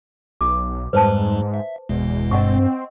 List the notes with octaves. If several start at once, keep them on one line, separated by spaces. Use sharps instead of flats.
B1 D6
F2 G#2 G3 G#3 B4 C5 A5
E5
G1 E2 B2 G#3
G2 C4 D#5 F#5 C#6